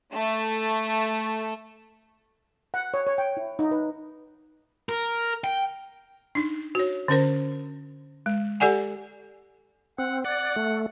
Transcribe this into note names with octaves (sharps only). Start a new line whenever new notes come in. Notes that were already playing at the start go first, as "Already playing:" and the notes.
A3
F#5
C#5
C#5
G5
E4
D#4
B4
A#4
G5
D4 D#4
F#4 C#5
D3 C#4 A#4 C5
G#3
G4 A4 D5 F#5 G#5
C4 F#5
D5 F#5
A3